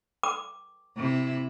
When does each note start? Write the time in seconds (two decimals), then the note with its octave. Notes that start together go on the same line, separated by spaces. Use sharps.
0.23 D6
0.97 C3 E4